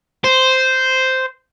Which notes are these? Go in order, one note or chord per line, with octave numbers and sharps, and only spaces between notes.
C5